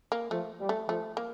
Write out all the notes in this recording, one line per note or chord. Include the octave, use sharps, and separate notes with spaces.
A#3
F3 A3
G3
A3
F3 A3
A#3